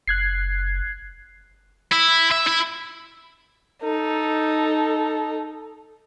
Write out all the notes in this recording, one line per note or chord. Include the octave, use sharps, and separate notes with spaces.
F#1 F#6 G#6 C7
E4
E5
E4
D#4 A4